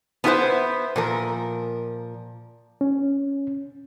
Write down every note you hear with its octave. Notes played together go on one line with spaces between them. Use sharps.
B3 C#4 E4 F4 B4 C5
A#2 F3 A#4
C#4